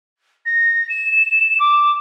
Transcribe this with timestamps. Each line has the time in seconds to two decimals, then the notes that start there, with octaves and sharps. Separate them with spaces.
0.46 A#6
0.89 E7
1.60 D6